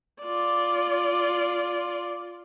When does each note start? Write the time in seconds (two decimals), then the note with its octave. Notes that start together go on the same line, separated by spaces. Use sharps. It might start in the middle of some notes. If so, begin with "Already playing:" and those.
0.23 F4 D5